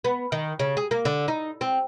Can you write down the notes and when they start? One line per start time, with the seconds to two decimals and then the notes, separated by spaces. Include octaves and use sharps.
0.04 B3
0.32 D#3
0.59 C#3
0.77 G#4
0.91 A#3
1.05 D3
1.28 D#4
1.61 C4